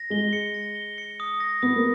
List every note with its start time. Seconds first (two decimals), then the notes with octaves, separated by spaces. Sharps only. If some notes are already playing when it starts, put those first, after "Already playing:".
Already playing: A#6
0.10 G#3 G7
0.33 C#7
0.54 A#6
0.75 G7
0.98 C#7
1.20 D#6
1.40 A#6
1.62 B3 D#6
1.76 A#3